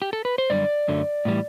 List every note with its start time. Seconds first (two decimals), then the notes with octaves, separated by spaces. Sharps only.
0.02 G4
0.13 A4
0.25 B4
0.38 C5
0.50 F#2 D3 G3 D5
0.88 F#2 D3 F#3 A3
1.25 A2 E3 G3